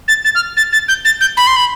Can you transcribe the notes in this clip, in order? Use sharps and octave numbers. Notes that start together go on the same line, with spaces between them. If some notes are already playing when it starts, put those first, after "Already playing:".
A6
A6
F6
A6
A6
G6
A6
G6
B5
C6
B5